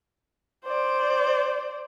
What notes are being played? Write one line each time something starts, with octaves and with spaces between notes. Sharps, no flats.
C5 D5